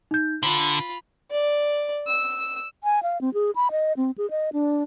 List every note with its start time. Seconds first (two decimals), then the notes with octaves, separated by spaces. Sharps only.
0.11 D#4 G6
0.43 D3 F4 B5 F#7
1.31 D5
2.08 E6
2.84 G#5
3.03 F5
3.21 C4
3.34 G#4
3.56 B5
3.71 D#5
3.97 C4
4.18 G#4
4.31 D#5
4.53 D4